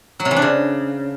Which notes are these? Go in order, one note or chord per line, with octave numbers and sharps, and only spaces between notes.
F#3
C3
E3
D4
C#3